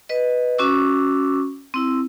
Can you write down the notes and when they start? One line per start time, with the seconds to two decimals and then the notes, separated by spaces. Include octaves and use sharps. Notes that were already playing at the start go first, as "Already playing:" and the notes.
0.09 B4 D#5
0.58 C#4 F#4 C#6 D6 E6
1.74 C4 E4 E6